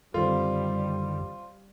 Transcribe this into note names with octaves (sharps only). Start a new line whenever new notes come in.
F#2 D3 D#3 G3 C4 F4